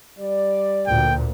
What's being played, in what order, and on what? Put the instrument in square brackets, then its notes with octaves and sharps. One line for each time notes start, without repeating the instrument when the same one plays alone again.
[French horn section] G3 D5
[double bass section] D2 A#2 [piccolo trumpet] G5